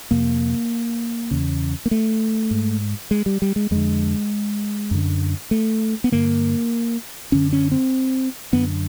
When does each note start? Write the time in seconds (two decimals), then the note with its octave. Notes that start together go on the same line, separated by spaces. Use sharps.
0.11 F2 C3 A#3
1.31 E2 C#3
1.86 A#3
1.91 A3
2.51 G#2
3.11 G#3
3.26 G3
3.42 G3
3.56 G#3
3.71 F2 D3 G#3
4.91 F#2 D3
5.51 A3
6.04 B3
6.12 G2 D3 A#3
7.32 F#2 D3 C#4
7.53 C#4
7.71 C4
8.53 F#2 D3 B3